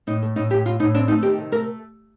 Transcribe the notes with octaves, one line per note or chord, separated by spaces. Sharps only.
A2 D#4
A3
A2 D#4
A2 G4
A2 F4
A2 D#4
C4 D4
A3 D#4
D#3 G4
C3
A3 A#4